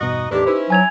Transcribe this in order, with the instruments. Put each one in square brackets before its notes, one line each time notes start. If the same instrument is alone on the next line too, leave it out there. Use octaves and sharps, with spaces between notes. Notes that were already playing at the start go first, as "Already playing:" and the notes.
[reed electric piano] E2 G2 B2 [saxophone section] D#4 F#4 D#5
[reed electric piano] E2 A2 B4 [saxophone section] D#3 A3 D4 [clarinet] G4
[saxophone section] C#4 E4 [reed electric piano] D#4 B4 C5
[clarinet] F#3 [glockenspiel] G#5 G#6 F7